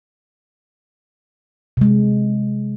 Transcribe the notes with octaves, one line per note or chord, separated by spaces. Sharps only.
C3 G#3